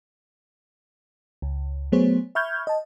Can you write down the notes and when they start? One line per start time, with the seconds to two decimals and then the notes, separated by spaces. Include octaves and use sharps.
1.42 C#2
1.92 F#3 A3 B3 G#4 C5 C#5
2.35 E5 B5 C#6 F6 G6 G#6
2.67 D#5 A5